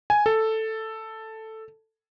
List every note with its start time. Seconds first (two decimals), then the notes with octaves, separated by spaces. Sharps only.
0.10 G#5
0.26 A4